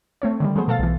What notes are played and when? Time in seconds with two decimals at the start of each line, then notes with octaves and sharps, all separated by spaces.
0.22 A3 C4 C#5
0.40 D3 D#3 G3
0.55 F3 F#3 A3 B3 G#4 C5
0.68 B2 A4 F5 A6
0.79 B1 E3